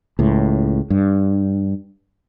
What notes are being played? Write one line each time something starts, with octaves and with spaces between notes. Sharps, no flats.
C#2 A2
G2